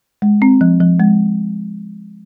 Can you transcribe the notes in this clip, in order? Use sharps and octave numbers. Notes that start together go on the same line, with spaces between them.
G#3
C4
F3
F3
G#3